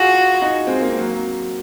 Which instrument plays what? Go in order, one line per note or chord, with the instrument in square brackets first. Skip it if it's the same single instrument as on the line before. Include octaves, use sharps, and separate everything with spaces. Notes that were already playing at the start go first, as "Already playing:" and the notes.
Already playing: [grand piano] F4 G#4 [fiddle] F#4
[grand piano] D#4 F#4
G#3 C4
A#3
C4
F#3 A#3